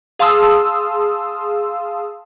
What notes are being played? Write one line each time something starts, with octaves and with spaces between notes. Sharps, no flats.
G#4 F5 A5 C6 D#6 E6